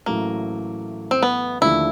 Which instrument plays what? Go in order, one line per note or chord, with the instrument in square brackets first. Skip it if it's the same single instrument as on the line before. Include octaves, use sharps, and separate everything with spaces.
[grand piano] A1 A2 F#3 A3 [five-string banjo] A#3
[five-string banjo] C4
B3
[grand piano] D#2 D3 F3 A3 D4 [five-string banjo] E4